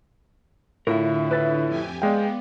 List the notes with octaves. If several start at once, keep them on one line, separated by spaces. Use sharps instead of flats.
A2 D3 E4 F4 A#4
B4 E5 A6
F2 G4 G#5
G#3 B3 D5 F5 G5